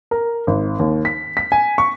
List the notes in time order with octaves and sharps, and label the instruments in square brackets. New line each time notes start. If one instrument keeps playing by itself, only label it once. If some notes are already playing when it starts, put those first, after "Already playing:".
[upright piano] A#4
G#1
D#2
B6
B6
G#5
C#6